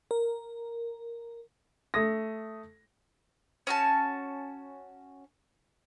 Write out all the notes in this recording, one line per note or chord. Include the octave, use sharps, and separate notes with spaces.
A#4
A3 D#6 A#6
C#4 F#4 A5